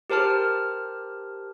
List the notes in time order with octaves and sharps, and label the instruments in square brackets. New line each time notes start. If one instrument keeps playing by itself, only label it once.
[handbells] G4 A#4 C5 A5 F6